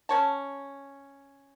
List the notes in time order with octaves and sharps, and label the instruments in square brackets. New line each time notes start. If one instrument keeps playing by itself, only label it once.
[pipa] C#4 C#5 A5